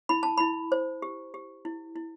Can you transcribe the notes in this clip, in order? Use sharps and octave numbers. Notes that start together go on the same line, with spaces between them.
E4 B5
A5
E4 B5
C5
G4
G4
E4
E4